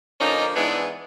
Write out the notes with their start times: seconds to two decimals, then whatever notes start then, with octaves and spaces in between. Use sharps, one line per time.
0.20 D3 F3 A#3 C#4 D#4
0.55 G#2 E3 G#3 B3 D4 E4